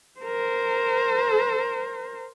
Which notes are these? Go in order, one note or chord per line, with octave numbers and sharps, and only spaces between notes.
A#4 C5